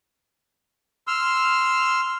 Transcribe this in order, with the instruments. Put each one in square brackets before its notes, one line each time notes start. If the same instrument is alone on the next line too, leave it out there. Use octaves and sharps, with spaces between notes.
[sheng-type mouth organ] C6 E6 F6